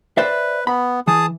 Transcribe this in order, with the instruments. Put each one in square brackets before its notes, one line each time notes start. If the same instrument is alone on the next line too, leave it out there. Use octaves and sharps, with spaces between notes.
[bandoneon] B4 [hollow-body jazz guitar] C5 D5 E5
[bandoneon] B3 [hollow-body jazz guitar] B5
[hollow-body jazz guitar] E3 [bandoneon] G#4 A5 D#6